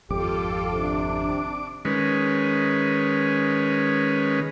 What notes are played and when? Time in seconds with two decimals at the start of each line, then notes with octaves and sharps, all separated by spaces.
0.10 G#1 F2 F4 G4 A4 D6
0.70 C3 D4
1.85 D#3 G#3 C#4 B4